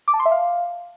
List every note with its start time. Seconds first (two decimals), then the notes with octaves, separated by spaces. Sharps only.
0.08 D6
0.14 A5
0.20 C6
0.26 E5
0.31 F5